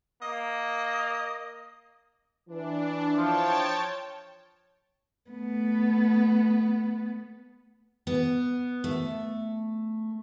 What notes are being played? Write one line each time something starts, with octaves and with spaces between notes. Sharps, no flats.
A#3 D#5
E3 D4
F3 C#5 G5 A5
A3 B3
B3
A3